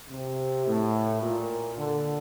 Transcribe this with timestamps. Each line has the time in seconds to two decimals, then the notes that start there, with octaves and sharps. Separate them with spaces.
0.10 C3
0.67 A2
1.23 A#2
1.77 D3